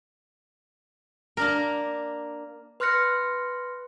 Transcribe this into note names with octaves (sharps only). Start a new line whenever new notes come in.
A#3 D4 A#4
B4 C6 F6 F#6 A#6 C#7